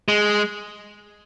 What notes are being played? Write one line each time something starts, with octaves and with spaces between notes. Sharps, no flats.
G#3